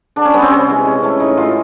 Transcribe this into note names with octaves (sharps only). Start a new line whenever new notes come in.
D3 D4
C#4
G3 B3
C4
C3 C#4
E3 G#3
C#3
E3 A3
A2 D#4
E3 G#3 F4